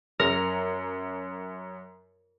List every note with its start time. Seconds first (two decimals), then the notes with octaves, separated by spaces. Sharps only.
0.20 F#2 A#4